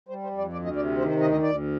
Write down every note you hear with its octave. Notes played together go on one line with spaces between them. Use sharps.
G3 C5
C5
F2
D5
D2 D5
D#5
C3 D5
D#3 C5
C5
D2 D#5
D#5
D2 D5